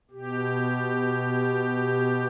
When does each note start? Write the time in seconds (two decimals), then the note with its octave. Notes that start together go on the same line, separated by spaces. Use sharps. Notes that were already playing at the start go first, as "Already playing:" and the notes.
0.11 B2 G4